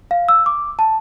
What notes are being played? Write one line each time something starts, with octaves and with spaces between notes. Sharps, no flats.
F5
E6
D6
A5